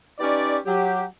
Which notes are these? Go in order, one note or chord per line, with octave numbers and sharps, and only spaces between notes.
C#4 D#4 G4 B4 D5
F#3 G4